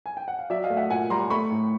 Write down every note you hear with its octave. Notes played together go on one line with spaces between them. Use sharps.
G#5
G5
F#5
F5
F#3 D5 E5
D#5 F5
A3
E5 F#5
A#2 F#5 G#5
G3 A#5 C6
A3 B5 C#6
A2